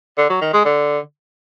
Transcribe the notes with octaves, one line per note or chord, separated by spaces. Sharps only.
D3
F#3
D#3
G#3
D3